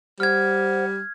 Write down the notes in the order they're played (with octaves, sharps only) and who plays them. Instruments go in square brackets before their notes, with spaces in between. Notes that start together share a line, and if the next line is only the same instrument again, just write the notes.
[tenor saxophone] G3 [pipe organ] C5 F#5 [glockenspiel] F6 G#6